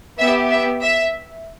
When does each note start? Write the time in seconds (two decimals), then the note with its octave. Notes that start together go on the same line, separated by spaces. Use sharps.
0.18 B3 G4 E5
0.50 E5
0.82 E5